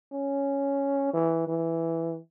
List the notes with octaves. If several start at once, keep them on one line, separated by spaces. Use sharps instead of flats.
C#4
E3
E3